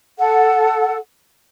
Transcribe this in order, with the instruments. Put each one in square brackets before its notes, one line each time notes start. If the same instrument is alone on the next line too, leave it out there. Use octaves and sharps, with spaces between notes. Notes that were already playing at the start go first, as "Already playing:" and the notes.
[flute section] A4 F#5